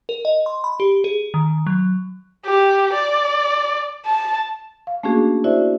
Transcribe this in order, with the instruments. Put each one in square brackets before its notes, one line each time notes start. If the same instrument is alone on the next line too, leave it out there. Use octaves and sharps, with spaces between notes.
[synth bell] A#4
D#5
C6
B5
G4
G#4
D#3
F#3
[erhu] G4
D5
A5
[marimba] F5
A3 A#3 C#4 D4 F#4 G#4
E4 F#4 C5 D5 E5